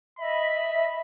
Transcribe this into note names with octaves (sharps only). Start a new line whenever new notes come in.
D#5 E5 B5